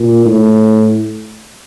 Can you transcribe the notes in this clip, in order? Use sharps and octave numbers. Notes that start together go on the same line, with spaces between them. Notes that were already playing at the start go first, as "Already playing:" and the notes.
Already playing: A#2
A2